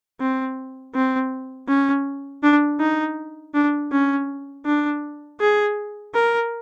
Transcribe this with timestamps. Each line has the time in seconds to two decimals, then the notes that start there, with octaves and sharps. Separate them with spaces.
0.20 C4
0.95 C4
1.68 C#4
2.43 D4
2.80 D#4
3.54 D4
3.92 C#4
4.65 D4
5.40 G#4
6.14 A#4